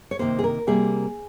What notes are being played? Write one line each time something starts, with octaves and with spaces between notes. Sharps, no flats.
C#5
C3 D#3 A#3 C5
G#4
A#4
C3 G3 A#3 G#4